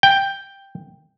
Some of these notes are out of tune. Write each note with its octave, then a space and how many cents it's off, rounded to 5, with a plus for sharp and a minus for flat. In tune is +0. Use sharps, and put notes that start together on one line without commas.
G5 +5